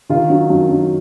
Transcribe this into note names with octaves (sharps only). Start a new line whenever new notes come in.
D#3 F4
F#3
F#2
F#2